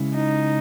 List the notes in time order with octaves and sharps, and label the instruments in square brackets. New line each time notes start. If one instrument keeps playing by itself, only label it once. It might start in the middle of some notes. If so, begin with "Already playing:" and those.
Already playing: [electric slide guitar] C#3 G#3 C#4 E4
[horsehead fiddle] D#4